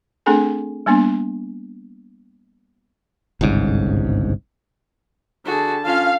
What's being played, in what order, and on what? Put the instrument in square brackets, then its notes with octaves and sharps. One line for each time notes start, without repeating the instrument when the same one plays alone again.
[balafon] A3 C4 D4 G#4 A4 G#5
G3 A#3 B3 D4
[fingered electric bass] G1 C2 G#2 C#3
[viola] D3 A5 [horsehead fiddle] F#4 G#4
[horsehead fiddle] C#4 F4 [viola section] F5